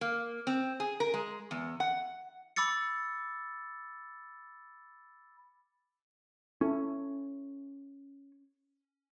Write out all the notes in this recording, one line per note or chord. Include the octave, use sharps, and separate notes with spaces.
A#3
C4
G#4
A#4
G#3
E2
F#5
B5 D6 E6 A6 C#7
C#4 E4 A4